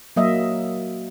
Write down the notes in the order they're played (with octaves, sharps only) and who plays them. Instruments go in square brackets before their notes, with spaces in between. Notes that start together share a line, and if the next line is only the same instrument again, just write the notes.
[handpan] F#3 A#3 D#5 E5